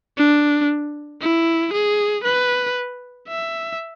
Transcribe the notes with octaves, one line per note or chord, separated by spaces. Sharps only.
D4
E4
G#4
B4
E5